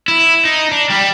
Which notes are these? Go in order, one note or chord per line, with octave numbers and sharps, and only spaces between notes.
E4
D#4
D4
G3